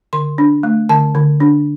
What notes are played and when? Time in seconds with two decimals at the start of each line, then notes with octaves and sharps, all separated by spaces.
0.13 D3 C6
0.38 D4
0.63 A3
0.89 D3 A5
1.15 D3
1.40 D4